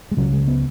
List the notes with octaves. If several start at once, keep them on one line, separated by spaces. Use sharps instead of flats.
G#3
C#2 C#3 F#3
G#3
B3